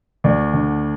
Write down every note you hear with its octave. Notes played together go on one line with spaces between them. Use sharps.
D2 D5
D3